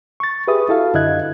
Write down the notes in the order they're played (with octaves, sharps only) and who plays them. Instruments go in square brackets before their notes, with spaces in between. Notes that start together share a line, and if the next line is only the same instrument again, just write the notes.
[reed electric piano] C#6 A6
G4 G#4 B4 E5 D#6
E4 F#4 A4 E5 F5
F#2 D3 E4 D#5 F#6 G#6